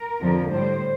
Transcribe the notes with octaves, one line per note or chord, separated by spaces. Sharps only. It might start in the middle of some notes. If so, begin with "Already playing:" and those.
Already playing: A#4
F2 D3 F3
A2 G3 C5